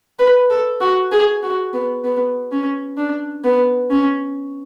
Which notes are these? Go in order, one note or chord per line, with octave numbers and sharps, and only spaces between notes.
B4
A4
F#4
G#4
F#4
B3
B3
C#4
D4
B3
C#4